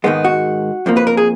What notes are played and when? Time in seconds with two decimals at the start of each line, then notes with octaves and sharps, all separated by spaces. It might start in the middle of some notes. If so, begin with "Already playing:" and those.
0.04 G#2 D#3 G#3 B3
0.25 F#4
0.86 F2 F3 A#3
0.97 B4
1.07 A#4
1.17 G#4